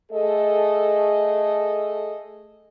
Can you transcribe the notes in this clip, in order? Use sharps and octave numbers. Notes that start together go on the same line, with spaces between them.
A3 G#4 A4 D#5